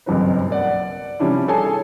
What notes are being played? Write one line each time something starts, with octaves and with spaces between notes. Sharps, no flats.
F#1 B1 G2 F#3 C4 B4
A#4 D5 F#5
C3 F3 G3 C#4 D4 E4
G#4 A4 C#5 G#5